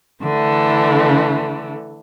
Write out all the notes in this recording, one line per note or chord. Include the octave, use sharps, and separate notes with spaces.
D3 E3 A3